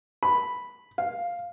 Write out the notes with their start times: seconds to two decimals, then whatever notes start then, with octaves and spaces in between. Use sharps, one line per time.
0.23 B5
0.98 F5